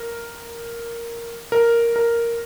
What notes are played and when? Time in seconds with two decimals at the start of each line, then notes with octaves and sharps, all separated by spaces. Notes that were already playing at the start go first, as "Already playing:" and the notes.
Already playing: A#4
1.52 A#4
1.96 A#4